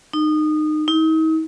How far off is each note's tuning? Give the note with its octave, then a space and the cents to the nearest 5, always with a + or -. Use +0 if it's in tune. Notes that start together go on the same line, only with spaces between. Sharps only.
D#4 -25
D#4 +40